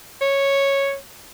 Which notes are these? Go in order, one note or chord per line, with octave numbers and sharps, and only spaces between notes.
C#5